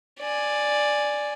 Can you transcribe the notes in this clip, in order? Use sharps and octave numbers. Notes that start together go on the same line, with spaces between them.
D5 G#5